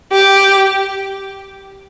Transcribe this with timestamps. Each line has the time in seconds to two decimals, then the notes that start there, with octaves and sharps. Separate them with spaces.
0.12 G4